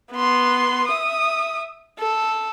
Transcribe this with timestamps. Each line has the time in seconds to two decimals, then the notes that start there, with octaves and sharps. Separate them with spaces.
0.11 B3 C6
0.88 E5 D#6
1.99 A4